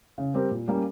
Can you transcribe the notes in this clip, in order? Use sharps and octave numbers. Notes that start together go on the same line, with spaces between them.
C#3
G3 C4 G4 A#4
A#2
G3 A#3 C#4